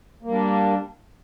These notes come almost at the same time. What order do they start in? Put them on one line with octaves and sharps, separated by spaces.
A#3 G3 D4